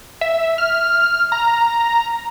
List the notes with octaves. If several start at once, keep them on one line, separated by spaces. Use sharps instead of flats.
E5
F6
A#5